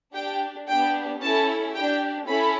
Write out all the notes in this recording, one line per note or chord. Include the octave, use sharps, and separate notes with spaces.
D4 G4 G5
B3 D4 G4 G5
C#4 E4 A4 A5
D4 G4 G5
C#4 E4 A4 B5